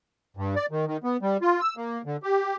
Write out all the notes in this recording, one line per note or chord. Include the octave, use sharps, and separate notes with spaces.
G2
D5
D#3
D#3
B3
G3
F4
E6
A#3
D3
G4